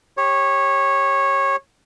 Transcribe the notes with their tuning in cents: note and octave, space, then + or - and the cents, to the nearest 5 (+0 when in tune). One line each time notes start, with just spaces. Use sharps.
G4 +15 C#5 -15